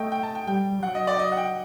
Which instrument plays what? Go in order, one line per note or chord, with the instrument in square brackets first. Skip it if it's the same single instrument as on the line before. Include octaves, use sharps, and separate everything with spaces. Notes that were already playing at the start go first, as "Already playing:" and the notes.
Already playing: [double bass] A3 [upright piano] D#5 G5
[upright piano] G5
A5
G5
[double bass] G3 [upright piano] G5
[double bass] F#3 [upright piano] F#5
[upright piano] D#5
D5
D#5
F#5
G5